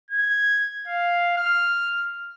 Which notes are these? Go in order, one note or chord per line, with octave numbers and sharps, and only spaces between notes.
G#6
F5
F6